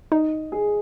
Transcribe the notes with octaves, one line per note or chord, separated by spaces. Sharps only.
D#4 D#5
G#4